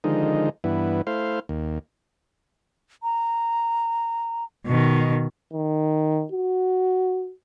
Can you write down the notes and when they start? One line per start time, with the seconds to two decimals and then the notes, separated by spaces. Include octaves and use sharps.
0.04 D3 D#3 F3 G#3 D#4
0.64 G2 E3 B3 E4
1.07 A3 E4 C5 F5
1.49 D#2
3.03 A#5
4.66 B2 D#3
5.53 D#3
6.32 F#4